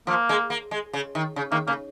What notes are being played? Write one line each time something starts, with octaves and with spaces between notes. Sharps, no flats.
F3 A#3
G#3
A#3
G#3
C#3
D#3
C#3
D#3 A#3
C#3 A#3